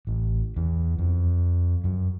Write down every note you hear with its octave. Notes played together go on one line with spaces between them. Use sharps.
A1
E2
F2
F#2